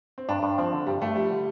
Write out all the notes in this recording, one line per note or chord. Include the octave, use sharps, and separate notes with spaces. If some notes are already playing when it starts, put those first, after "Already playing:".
C4
G2 D4
G2
F3 C4
D3
G2 G3
G2 A3
F3 G3
D3